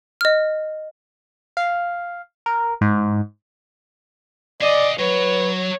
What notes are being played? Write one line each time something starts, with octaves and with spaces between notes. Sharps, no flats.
D#5 F6
F5
A#4
G#2
D5 D#5 F5 G#5
F#3 B4 C#5